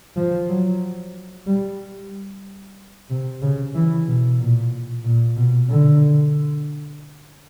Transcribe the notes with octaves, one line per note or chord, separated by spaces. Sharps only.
F3
F#3
G3
C3
C#3
E3
B2
A#2
A#2
B2
D3